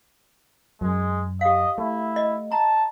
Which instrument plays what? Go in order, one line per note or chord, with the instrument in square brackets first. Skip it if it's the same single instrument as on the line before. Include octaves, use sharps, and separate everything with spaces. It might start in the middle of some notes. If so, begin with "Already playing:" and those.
[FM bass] F#2 [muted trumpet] G#3
[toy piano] G4 F5 [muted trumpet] D#5
[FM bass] A3 [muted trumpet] E4
[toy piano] D#5
[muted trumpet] A5 [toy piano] A#5